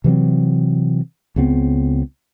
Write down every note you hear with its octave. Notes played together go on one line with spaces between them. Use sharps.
C3 E3 F#3 C4
C#2 C#3 B3 C4